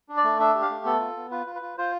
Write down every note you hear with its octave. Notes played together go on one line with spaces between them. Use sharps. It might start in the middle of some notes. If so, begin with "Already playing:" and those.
D4
D5
A3
D4 E5
G4
F5
A3
B3 A4
F4
B3
F4 B4
F4
B4
F4
F4 C5